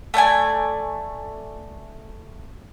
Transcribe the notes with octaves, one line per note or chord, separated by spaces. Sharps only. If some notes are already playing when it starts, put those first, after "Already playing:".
A3 D5 G5 G#5